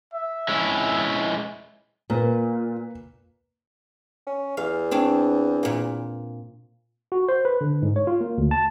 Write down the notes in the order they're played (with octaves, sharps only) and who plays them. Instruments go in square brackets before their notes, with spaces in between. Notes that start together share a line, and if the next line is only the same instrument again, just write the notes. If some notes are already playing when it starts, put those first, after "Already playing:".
[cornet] E5
[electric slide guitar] G#3 C#4 E4
[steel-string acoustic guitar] A#2 [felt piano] A#3 B4
[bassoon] C#4
[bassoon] E2 [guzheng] F5
[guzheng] C4 D4 C#5
A#2 A#3
[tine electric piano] F#4
C5
B4
D3
G#2
C#5
F4
A#3
D2
A5